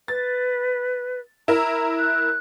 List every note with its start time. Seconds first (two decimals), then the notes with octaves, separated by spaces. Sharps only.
0.08 B4 A6
1.48 E4 A#4 A#5
1.97 F#6